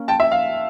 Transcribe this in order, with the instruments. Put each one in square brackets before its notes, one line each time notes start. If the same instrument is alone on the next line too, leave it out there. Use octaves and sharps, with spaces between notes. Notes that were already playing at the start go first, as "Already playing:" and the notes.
Already playing: [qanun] A#3 C#4
[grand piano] G5 A5
E5
F5